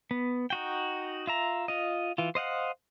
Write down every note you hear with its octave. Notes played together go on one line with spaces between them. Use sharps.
B3
D#4 F#4 G5
F4 E5 A#5
F4 D#5
E3 F4
C5 D#5 F5 F#5